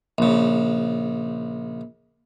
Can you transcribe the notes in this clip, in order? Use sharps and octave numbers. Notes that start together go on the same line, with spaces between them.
A#1 C#3